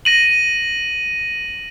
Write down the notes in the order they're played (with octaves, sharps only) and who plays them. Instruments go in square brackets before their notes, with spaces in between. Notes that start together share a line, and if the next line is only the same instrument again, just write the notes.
[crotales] A#6 D#7 F#7